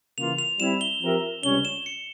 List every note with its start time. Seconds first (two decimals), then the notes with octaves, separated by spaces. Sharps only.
0.17 C#3 E3 A#3 F4 F7
0.39 F7
0.59 G3 C4 E4 E7
0.81 G7
1.02 F3 C4 G4 A#4 E5
1.43 C#2 C3 G3 C#4 G7
1.65 E7
1.86 C#7